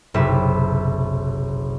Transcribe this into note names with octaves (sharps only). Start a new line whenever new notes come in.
F#1 B1 C3 E5 B5